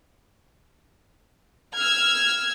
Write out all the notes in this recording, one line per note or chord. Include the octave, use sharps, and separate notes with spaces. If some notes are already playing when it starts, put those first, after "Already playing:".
E6 F6 G#6